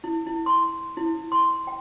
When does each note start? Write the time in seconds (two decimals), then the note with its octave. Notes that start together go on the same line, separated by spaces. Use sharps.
0.04 E4
0.27 E4
0.46 C6
0.97 E4
1.32 C6
1.67 G5